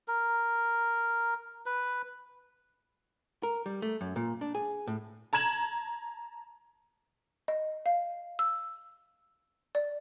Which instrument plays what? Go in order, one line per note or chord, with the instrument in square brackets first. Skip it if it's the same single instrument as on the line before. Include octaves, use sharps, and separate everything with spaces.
[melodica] A#4
B4
[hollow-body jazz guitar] A#4
G3
A3
F#2
A#2
D4
G#4
A2
[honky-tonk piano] A5 A#5 G#6 E7 F#7
[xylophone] D#5
F5
E6
D5